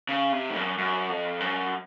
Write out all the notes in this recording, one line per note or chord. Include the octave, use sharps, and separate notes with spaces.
C#3
C3
F2
F#2
F#2
F2
F#2